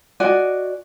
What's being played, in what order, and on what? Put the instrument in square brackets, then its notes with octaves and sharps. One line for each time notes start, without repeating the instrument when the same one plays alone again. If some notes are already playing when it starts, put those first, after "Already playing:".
[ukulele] F#4 D5 D#5 G#5